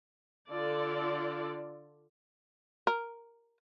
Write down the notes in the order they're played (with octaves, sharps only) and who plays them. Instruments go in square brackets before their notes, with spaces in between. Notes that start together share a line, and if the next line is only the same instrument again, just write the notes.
[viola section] D3 F4 A4 D5
[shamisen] A#4